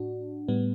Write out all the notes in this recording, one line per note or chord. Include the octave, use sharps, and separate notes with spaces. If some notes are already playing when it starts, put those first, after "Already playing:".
Already playing: A2 D4 F#4
A2 G3 B3